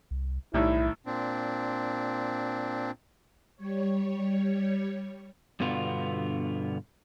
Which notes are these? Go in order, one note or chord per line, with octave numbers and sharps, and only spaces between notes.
C2
B1 A2 D#3 G3 E4
A#2 C4 D4
G3 C#5
G2 B2 D3 B3 F4